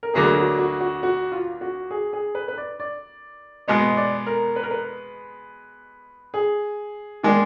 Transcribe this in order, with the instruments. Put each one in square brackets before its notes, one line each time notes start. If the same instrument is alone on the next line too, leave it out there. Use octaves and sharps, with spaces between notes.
[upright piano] A#4
[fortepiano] D2 D3 F#3 A#3 [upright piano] G#4
[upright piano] F#4
F#4
F#4
F#4
F4
F#4
G#4
G#4
B4
B4
D5
D5
[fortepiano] B2 G#3 B3 [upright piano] D#5
[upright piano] D5
A#4
B4
A#4
B4
G#4
[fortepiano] D#3 G#3 D4